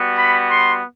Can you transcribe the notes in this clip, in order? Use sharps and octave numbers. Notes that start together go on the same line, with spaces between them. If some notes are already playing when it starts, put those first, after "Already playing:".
Already playing: G3 B3 F#4
B5
C6